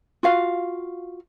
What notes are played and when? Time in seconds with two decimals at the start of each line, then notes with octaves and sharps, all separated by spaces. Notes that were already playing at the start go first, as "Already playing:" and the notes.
0.23 F4 F#4 F5